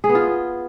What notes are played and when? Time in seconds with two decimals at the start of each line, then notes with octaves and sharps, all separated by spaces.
0.04 G#4
0.09 B3
0.15 F4